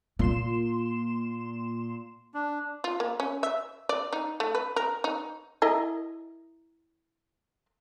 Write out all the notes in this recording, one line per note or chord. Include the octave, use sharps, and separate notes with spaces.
A#2 A#3 C6 E7
D4
F4
A#3
C#4
E5
D5
D#4
A3
B4
A#4
D#4
E4 A#4 D#5